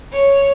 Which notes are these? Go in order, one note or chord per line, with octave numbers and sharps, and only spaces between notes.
C#5